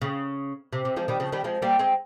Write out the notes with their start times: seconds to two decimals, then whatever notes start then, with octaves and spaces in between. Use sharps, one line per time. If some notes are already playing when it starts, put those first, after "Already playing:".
0.02 C#3
0.73 C3
0.85 C3
0.96 F3 G#3
1.08 D#3 G3
1.20 C#3 F3
1.32 D#3 G3
1.44 F3 G#3
1.62 G3 A#3
1.79 G#3 C4